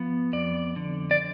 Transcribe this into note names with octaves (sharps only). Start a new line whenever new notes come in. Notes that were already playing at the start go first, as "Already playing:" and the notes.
Already playing: F3 B3
F2 D5
D3
D5